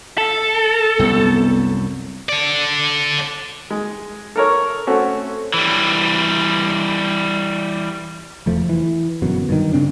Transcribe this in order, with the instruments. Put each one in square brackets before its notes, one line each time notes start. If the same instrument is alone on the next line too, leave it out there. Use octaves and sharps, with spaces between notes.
[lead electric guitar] A4
[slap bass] C2 F#2 [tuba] B3
[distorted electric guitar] A4 D5
[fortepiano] G#3
A4 A#4 C#5
A3 C4 C#4 F#4 A4
[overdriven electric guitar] E3 G3
[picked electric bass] F1 E2 F3 A3
E3
G1 F#2 B2
G2 D#3
C#3 C4 D4